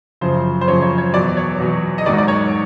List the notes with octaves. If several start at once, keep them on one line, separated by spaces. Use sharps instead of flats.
F#2 C#3 F3 C5
C5
F#2 C#3 F3 C#5
C#5
C#5
E2 B2 F#3 D5
C#5
E2 B2 F#3
D#5
G#2 D#3 F#3 D5
D5
C#5